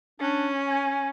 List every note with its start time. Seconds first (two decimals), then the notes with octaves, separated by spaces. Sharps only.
0.20 C#4 D4
0.67 G#5